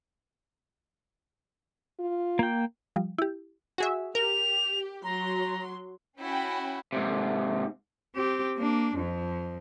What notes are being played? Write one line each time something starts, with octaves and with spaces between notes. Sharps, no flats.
F4
A#3 G5
F3 G3
E4 G4
F#4 G#4 E5
G4 A#4 F7
F#3 A#5 C6
C#4 E4 F#4 G5 B5
G#2 C3
C4 G4
A#3 D4
F2 F3